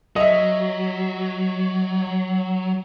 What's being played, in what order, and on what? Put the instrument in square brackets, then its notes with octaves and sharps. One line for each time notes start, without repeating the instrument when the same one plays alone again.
[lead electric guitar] F#3 [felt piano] D#5 E5